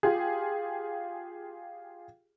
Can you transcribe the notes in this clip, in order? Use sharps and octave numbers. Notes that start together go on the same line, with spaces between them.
F4 G4 G#4